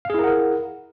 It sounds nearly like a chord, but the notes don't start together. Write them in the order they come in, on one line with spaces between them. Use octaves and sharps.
F5 G#4 E4 A#4 F#5